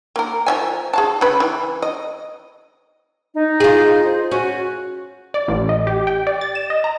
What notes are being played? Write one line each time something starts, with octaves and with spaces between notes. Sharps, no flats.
A#3 A#4
F3 E5 G#5
G#4 F5 A5
C#3 B4
E3
D#5
D#4
F4 G#4
C5
C#4 F#4
D5
A1
D#5
G4
G5
D5
A6
E7
D#5
A#5